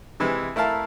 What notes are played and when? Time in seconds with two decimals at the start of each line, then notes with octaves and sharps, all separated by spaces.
0.20 C3 E3 G#3
0.56 A3 E4 A#4 F5 A5